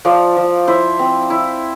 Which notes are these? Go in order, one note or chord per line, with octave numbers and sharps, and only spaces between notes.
F3 D5 F5
F3
E4 C5 E5
C4
E4